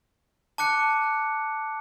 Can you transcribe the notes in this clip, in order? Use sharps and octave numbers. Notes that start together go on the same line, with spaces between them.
A5 D6 F#6 C#7